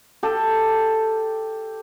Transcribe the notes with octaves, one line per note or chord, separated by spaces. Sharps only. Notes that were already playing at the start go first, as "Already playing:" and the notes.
G4 A4